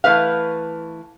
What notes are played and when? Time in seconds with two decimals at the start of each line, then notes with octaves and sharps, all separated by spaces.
0.04 E3 A3 B4 F5